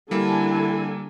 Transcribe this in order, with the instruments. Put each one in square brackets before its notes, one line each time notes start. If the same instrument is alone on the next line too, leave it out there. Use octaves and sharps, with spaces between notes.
[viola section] D3 A4 G#5 [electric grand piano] G3 A#3 [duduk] E4